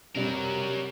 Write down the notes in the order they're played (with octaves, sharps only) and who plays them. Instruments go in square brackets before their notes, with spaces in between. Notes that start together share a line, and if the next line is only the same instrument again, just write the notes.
[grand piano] C3 G3 [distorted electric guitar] F#3 A#4